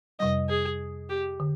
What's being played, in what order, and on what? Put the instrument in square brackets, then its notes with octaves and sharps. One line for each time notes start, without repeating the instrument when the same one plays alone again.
[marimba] F2 C3 G3 [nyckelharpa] D#5
[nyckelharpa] G#4
G4
[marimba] D3